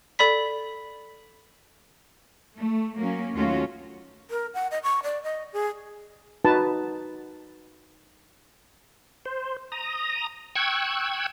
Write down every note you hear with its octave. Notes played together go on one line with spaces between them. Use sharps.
A4 D5 B5 B6
A3
F#3 A#3 C#4
D#2 F#3 A3 C#4 F4 F#4
A#4
F#5
D#5
C#6
D5
D#5
G#4
D#4 F#4 B4 A5
C5
A#5 D#6
G5 C#6 E6 F#6 G#6